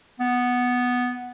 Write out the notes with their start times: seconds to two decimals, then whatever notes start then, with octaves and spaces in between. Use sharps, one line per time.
0.20 B3